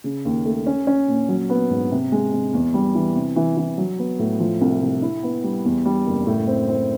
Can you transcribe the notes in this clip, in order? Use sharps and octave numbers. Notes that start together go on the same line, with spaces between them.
C#3
D#2
A3
C#4
C#4
A#2
F#3
B3
G#2
C3
G#3
C3
E2
G3
E3
C3
E3
E3
F#3
B3
A2
F3
C2
C3
E4
B3
G3
E2
G3
F#1
A2
C4
C4